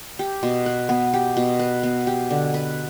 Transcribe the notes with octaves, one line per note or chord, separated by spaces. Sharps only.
G4
B2
B4
B3
G4
B2
B4
B3
G4
D3
B4